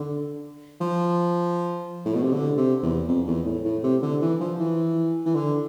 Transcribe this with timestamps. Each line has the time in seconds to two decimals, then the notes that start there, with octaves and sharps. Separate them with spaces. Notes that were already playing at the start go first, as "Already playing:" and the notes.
Already playing: D3
0.81 F3
2.05 A2
2.14 B2
2.23 C3
2.33 D3
2.57 C3
2.83 E2
3.08 F2
3.27 E2
3.46 A2
3.65 A2
3.84 C3
4.02 D3
4.21 E3
4.40 F3
4.59 E3
5.26 E3
5.35 D3